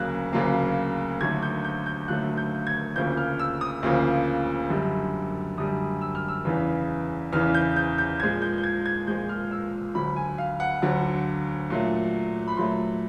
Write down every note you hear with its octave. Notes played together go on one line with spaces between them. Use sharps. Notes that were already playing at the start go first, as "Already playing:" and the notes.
Already playing: D2 C#3 F#3 A#3 F#6
D2 C#3 F#3 A#3
D#2 D3 F#3 A3 G#6
G6
G6
G6
D#2 D3 F#3 A3 F#6
G6
G#6
D2 C#3 F3 A#3 G6
F6
E6
D#6
D2 C#3 F3 A#3
F#2 D3 G3
F#2 D3 G3 D#6
E6
F6
E6
E2 C#3 E3
E2 C#3 E3 F6
G6
G6
G6
A#2 F3 G#3 G#6
G6
G6
G#6
G#6
A#2 F3 G#3 G6
F6
E6
D2 D3 F#3 B5
G#5
F5
F#5
D2 D3 F#3
A#2 F#3 A3
B5
A#2 F#3 A3 C6